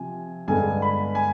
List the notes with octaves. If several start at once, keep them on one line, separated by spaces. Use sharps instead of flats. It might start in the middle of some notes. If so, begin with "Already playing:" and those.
Already playing: C3 F3 G#5
G2 D3 G#3 B3 G#5
B5
G#5